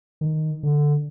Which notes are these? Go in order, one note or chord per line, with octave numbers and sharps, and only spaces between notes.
D#3
D3